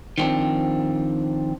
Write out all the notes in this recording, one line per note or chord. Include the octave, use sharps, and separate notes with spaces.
D#3 F3 G3 C4 D4